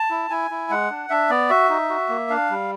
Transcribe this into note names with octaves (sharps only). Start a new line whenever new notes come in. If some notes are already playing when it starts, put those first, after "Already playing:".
Already playing: A5
E4
E4 G#5
E4
G#3 F#5
D4
D4 E5
B3 D5
F#4 E5
D#4
F#4
A#3
D4 F5
G3